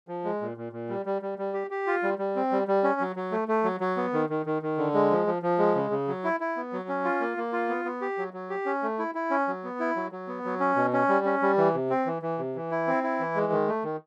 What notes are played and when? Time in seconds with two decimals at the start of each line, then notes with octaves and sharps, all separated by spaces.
0.08 F3
0.24 G#3
0.41 A#2
0.57 A#2
0.73 A#2
0.89 G3
1.06 G3
1.22 G3
1.38 G3
1.54 G4
1.71 G4
1.87 F4
2.03 G3
2.19 G3
2.36 C4
2.52 G3
2.68 G3
2.83 C#4
3.00 F#3
3.16 F#3
3.32 A3
3.48 A3
3.64 F#3
3.80 F#3
3.97 B3
4.13 D#3
4.29 D#3
4.46 D#3
4.62 D#3
4.78 D3
4.94 G#3
5.11 F3
5.27 F3
5.42 F3
5.58 G#3
5.75 C#3
5.91 C#3
6.08 F#3
6.24 E4
6.40 E4
6.57 B3
6.73 F#3
6.89 C#4
7.04 F4
7.20 A#3
7.37 A#3
7.53 F4
7.69 B3
7.85 B3
8.01 G4
8.18 F#3
8.33 F#3
8.50 G4
8.66 C#4
8.82 A3
8.99 E4
9.15 E4
9.30 C#4
9.48 F#3
9.64 B3
9.80 E4
9.96 F#3
10.12 F#3
10.28 B3
10.45 F#3
10.60 C#4
10.76 B2
10.93 C#4
11.09 G3
11.25 C#4
11.42 G3
11.57 E3
11.74 C3
11.90 C4
12.06 E3
12.22 E3
12.39 C3
12.55 E3
12.71 E4
12.87 C4
13.04 E4
13.20 E3
13.35 G#3
13.52 D#3
13.68 A3
13.84 D#3